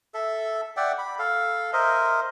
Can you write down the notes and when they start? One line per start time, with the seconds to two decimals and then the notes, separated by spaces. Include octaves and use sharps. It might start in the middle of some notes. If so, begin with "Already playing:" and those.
0.14 A4 E5
0.77 D5 E5 F#5 G5
0.98 B5
1.19 A4 F5
1.73 A#4 C5 D#5 E5